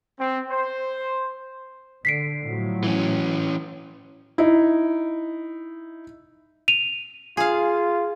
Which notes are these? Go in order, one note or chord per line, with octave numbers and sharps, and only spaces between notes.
C4
C5
D3 B6 C7 D7
A2 F3 F#3
E3 C#4
D#4 E4
D#7 F7
F4 G#4 F5